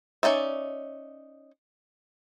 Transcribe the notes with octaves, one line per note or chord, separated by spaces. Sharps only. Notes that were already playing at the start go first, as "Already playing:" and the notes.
C#4 D#4 D5 E5